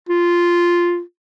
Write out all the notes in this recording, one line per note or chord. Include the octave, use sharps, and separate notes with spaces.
F4